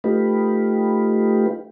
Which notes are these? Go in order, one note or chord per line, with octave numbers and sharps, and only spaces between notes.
A3 D#4 F4 G4 B4